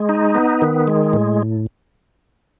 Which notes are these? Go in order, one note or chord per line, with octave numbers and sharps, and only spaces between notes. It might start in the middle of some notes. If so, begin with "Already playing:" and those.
Already playing: G#3
D#4
B3
D#3
G#3
A2